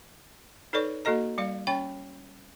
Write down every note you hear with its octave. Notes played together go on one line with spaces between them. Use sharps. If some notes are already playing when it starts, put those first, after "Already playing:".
D#4 A4 B4 C#5 D5 C#6
A#3 F#4 A4 D#5 A#5
G3 D5 F5
C#4 C#5 G5 B5 C#6